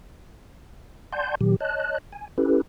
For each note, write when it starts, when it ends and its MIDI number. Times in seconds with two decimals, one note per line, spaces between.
1.13 1.35 74
1.13 1.35 78
1.13 1.35 80
1.13 1.35 81
1.13 1.35 84
1.13 1.35 91
1.41 1.56 46
1.41 1.56 51
1.41 1.56 54
1.41 1.56 67
1.60 1.98 73
1.60 1.98 75
1.60 1.98 81
1.60 1.98 90
2.12 2.28 80
2.38 2.62 61
2.38 2.62 64
2.38 2.62 67
2.38 2.62 69
2.38 2.62 71